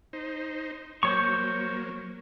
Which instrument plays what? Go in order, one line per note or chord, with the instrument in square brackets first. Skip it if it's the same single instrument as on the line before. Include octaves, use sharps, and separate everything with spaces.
[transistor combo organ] D#4 C5
[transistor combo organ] F#3 A#3 [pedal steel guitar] C5 C#5 C#6